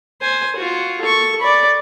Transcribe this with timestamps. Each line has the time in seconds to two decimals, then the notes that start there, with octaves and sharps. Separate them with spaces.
0.21 C5 G#5
0.56 F4 F#4
1.01 A4 C#6
1.41 D5 B5